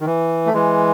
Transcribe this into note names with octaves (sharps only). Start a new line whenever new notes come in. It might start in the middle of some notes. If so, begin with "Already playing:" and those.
D#3
E3
A3
E3 G#3